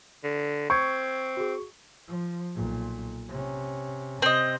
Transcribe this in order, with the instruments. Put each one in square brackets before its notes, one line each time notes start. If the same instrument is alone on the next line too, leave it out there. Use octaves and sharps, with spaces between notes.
[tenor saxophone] D3
[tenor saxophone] C4 [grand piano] C#6 [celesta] G6 G#6
[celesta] F#4 G#4
[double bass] F3
B1 A#2
C3 C#4
[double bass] C3 [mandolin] C4 D#5